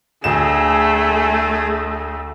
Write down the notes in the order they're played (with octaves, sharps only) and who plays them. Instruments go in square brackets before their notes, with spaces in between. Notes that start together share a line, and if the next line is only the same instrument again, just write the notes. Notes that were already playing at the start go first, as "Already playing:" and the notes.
[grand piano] D2 E7 [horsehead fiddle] A3 [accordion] G#4